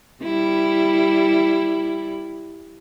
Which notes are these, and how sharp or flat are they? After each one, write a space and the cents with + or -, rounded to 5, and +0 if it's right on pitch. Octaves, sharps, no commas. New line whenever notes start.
G3 +0 E4 +0